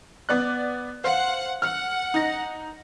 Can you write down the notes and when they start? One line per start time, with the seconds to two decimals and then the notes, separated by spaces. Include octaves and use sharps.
0.29 B3 D5 F#6
1.04 C5 F5 F#5
1.62 F#5 F6
2.14 D#4 A#6